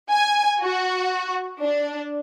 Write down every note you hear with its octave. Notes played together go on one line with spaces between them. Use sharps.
G#5
F#4
D4